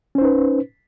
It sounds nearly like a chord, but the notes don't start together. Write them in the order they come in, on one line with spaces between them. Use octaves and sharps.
C#4 C5 D#4 B4